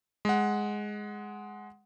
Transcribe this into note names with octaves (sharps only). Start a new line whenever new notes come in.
G#3 F#5